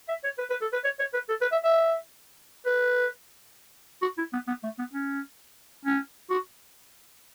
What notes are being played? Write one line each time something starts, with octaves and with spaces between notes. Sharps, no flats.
E5
C#5
B4
B4
A4
B4
C#5
C#5
B4
A4
B4
E5
E5
B4
F#4
E4
B3
B3
A3
B3
C#4
C#4
F#4